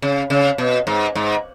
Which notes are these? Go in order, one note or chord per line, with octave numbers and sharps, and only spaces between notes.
C#3
C#3
B2
G#2
G#2